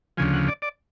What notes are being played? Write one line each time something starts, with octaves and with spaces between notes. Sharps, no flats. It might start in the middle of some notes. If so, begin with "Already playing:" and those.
D2 C#3 F3 G#5
F#5
D5
D5